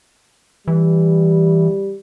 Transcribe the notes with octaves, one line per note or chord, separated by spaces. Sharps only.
E3 G3